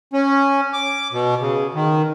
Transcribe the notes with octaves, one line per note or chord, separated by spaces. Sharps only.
C#4
D6
B2
C#3
D#3